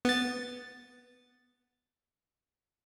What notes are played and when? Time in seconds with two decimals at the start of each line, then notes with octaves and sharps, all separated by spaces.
0.05 B3 A6